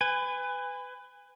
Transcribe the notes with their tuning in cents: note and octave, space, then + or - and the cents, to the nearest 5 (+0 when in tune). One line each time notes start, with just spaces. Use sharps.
B4 +25 G#5 -25